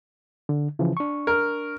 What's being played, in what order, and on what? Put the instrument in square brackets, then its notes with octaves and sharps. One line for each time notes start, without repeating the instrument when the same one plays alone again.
[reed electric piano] D3
C#3 E3 F3
D4 C#6
[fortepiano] A#4